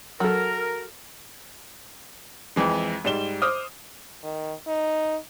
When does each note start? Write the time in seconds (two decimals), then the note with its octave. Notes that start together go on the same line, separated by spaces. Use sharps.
0.20 F#3 A4 A#4
2.56 F2 E3 G#3
3.05 G#2 G3 E7 G7
3.42 C5 D6 D#6 F6
4.24 D#3
4.67 D#4